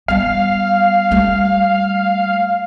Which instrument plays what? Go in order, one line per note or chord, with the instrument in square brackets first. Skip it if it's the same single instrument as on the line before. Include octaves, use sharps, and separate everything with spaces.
[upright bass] G3 B3 [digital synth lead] F5
[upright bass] G3 A3